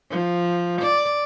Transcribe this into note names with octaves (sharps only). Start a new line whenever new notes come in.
F3
D5